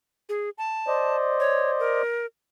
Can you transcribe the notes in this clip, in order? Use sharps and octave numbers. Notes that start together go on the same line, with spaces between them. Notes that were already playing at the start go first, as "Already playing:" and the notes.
G#4
A5
C5 D5 D#5
C#5
A#4